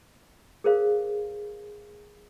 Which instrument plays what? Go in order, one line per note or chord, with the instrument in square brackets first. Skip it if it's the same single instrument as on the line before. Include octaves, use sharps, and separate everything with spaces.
[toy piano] G#4 A#4 C5 F5